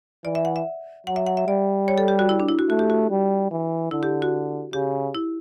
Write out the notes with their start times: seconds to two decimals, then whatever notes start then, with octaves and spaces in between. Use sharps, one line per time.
0.25 E3 D5
0.35 E5
0.45 F#5
0.56 E5
1.06 F#3 F#5
1.16 E5
1.26 F#5
1.37 E5
1.47 G3 D5
1.88 C#5
1.98 A4
2.08 G4
2.19 F#4
2.29 E4
2.40 D4
2.49 E4
2.59 F#4
2.69 A3 F#4
2.79 G4
2.90 F#4
3.10 G3
3.51 E3
3.91 D3 E4
4.03 G4
4.22 F#4
4.73 C#3 G4
5.15 E4